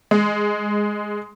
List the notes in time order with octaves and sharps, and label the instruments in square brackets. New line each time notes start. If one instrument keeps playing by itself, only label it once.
[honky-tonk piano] G#3